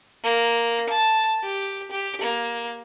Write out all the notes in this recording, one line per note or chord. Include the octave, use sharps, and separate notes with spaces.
A#3
A5
G4
G4
A#3